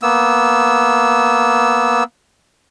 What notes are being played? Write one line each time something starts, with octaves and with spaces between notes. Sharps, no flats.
A#3 B3 E6